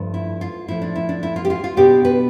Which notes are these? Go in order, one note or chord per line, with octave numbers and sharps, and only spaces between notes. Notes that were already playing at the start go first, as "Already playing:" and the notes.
Already playing: G2 F3 A3
E4
F4
A2 F3 A3 E4
D4
E4
D4
E4
F4
G4
F4
F4
B2 B3 D4 G4
B4